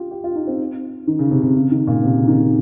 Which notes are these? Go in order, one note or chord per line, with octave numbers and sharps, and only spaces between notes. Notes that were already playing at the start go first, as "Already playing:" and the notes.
Already playing: F4 G4
G4
F4
D#4
C4
D#3
C#3
C3
C3
C#3
D#3
A#2
C3
C#3
D#3